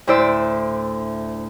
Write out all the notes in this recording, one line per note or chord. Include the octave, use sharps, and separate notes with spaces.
D2 A2 E4 C5 D5 E6